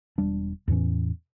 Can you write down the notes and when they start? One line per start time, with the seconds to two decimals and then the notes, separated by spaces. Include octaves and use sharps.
0.18 E1 G3 D4
0.68 E2 A2 E3 C#4